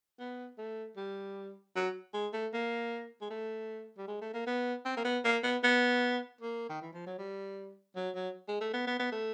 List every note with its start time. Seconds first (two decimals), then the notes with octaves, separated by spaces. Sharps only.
0.20 B3
0.58 A3
0.97 G3
1.75 F#3
2.13 G#3
2.33 A3
2.53 A#3
3.21 G#3
3.30 A3
3.98 G3
4.07 G#3
4.21 A3
4.33 A#3
4.47 B3
4.85 C4
4.97 A#3
5.05 B3
5.24 A#3
5.43 B3
5.63 B3
6.41 A#3
6.69 D#3
6.82 E3
6.93 F3
7.06 F#3
7.18 G3
7.96 F#3
8.15 F#3
8.48 G#3
8.61 A3
8.73 B3
8.87 B3
8.99 B3
9.12 A3